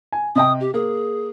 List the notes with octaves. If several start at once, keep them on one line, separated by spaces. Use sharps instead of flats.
G#5
C3 D#5 G5 D#6
G4
A#3 G#4